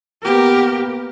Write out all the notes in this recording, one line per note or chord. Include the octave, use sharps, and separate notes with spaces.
A#3 B3 G4 A#4